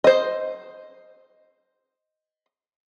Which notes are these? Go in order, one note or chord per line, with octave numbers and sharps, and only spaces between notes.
C5 D#5